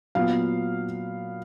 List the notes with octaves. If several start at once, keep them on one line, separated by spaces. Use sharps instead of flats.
A#2 F#3 B3 F5